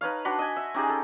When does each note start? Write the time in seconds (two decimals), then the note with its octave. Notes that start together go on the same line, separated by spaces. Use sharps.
0.01 D#4 B4 C#5 F5
0.25 D4 F#4 B5 C6
0.39 D#5 G#5
0.56 E5
0.74 C#4 D#4 G4 G#4
0.89 A4